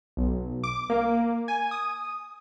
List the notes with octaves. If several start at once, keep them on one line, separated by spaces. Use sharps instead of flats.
B1
D6
A#3
G#5
D#6